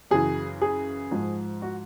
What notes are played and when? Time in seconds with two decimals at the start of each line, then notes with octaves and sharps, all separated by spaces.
0.11 F#2 C#3 E3 G#4
0.62 G#4
1.11 G#2 F3
1.62 F#4